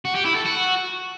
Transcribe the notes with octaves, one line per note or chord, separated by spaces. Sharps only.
F#4
G4
E4
A4
F#4